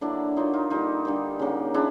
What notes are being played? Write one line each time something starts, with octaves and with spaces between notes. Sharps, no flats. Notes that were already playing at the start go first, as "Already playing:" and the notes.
D3 F#3 A#3 D4 E4
D3 F#3 A#3 D#4 F4
D#4 F4
D3 G3 A#3 D#4 F4
D3 G3 A#3
C#3 F#3 A#3
C#3 D4 E4